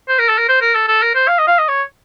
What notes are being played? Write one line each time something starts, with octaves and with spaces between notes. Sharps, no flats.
C5
A#4
A4
A#4
C5
A#4
A4
A4
A#4
C5
F5
D#5
F5
D#5
C#5